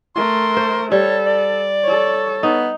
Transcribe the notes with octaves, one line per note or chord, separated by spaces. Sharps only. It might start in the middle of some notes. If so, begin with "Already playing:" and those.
A3 A#4 C6
C5
G3 A4 C#5
D5
A4 C#5
B3 D#4